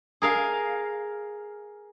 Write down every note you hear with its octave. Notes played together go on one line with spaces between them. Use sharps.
G#4 A#4 F5